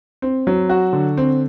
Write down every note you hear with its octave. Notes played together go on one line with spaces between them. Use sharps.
C4
F#3
F#4
D3
C4